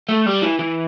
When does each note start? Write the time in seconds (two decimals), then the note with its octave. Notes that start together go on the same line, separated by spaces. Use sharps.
0.09 A3
0.26 G3
0.42 E3
0.59 E3